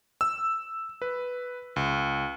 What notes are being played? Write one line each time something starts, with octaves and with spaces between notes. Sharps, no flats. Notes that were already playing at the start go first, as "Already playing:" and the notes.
E6
B4
C#2